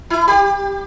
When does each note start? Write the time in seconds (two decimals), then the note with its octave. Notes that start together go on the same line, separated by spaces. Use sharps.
0.10 E4
0.28 G4